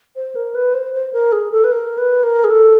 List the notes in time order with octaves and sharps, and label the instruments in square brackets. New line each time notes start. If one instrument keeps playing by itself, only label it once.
[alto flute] C5
A#4
B4
C5
C5
A#4
G#4
A4
B4
A#4
B4
A#4
G#4
A4